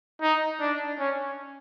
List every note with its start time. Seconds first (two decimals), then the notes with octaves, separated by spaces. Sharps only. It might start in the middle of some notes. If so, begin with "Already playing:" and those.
0.22 D#4
0.60 D4
0.99 C#4